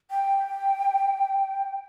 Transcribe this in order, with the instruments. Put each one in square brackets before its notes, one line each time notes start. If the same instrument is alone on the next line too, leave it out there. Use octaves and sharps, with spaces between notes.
[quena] G5